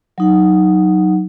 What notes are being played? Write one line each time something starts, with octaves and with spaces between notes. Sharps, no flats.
F#3 D#4 F#5